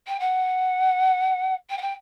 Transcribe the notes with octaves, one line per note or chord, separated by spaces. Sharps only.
G5
F#5
G5
F#5
G5